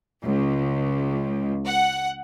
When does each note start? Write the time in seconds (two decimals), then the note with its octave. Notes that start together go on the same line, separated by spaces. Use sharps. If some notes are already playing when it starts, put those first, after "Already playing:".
0.24 C#2
1.66 F#5